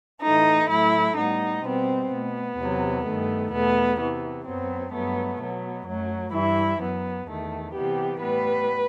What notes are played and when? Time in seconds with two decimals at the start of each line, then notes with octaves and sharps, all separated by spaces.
0.23 A2 E3 A3 D#4
0.70 A2 F#3 A3 E4
1.17 A2 G3 B3 D#4
1.63 B2 G3 B3 C4
2.10 B2 A3 B3
2.57 E2 C3 F#3
3.04 G2 D#3 A3
3.51 E2 B2 A3 B3
3.98 C3 E3 B3
4.45 F#2 F#3 B3 C4
4.92 G2 F#3 A3 B3
5.39 B2 F#3 B3
5.86 F#2 F#3 A3
6.32 G2 E3 G3 E4
6.79 F#2 F#3 B3
7.27 E2 D#3 A3
7.74 C3 E3 G3 B3 G4
8.21 A2 G3 B3 B4